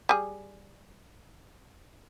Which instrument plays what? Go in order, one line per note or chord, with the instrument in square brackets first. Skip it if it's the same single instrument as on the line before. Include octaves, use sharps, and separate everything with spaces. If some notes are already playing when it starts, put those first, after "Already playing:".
[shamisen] G3 G#4